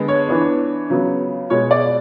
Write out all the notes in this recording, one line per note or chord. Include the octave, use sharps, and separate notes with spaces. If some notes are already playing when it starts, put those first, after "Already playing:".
Already playing: D3 G#3 B3
C#5
E3 B3 D4
C#3 F#3 B3
B2 G#3 B3 C#5
D5